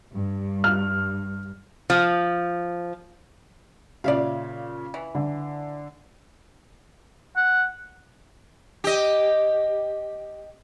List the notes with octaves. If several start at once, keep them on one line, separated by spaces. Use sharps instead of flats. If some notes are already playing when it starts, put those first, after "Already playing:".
G2
F6
F3
A#2 C#3 D5 E5 F5
E3
D3
F#5
G4 D#5